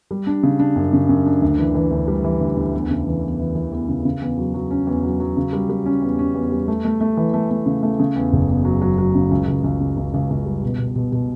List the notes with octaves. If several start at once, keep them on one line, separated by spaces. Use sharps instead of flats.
G3
D4
C#3
D4
F#2
C#3
F#2
D4
D2
E3
E3
D2
G3
E3
D2
D2
E2
C#3
E3
E2
E3
E3
E2
C#3
C#3
E2
F#3
F#3
C#4
E2
F#3
F#3
C#3
G3
G3
C#4
E2
C#4
E2
G3
A3
A3
A3
E3
A3
A3
C#3
A3
C#3
E2
F#1
E2
F#3
F#3
F#3
C#3
C#2
C#2
C#2
C#3
C#2
C#2
C#2
G3
B2
B2
B2
B2